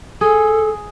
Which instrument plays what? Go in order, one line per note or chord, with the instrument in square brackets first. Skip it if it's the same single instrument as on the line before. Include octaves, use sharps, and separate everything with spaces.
[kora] G#4 [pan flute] A4